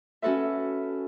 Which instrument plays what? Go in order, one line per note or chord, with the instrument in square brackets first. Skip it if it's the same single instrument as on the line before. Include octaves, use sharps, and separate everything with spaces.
[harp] C#4 F#4 A4 B4 E5